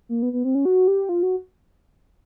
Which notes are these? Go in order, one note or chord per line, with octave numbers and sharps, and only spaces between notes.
A#3
B3
B3
C4
C#4
F#4
G4
F4
F#4